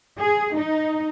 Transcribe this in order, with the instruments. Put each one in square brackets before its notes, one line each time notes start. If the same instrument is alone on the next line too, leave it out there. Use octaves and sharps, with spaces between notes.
[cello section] G#4
D#4